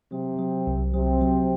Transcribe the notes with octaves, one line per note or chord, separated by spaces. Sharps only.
C3 F#3 C4
F#3
C2
C3 F#3 C4
F#3